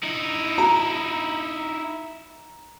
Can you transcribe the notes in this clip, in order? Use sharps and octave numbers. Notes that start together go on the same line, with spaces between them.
D#4 E4
A#5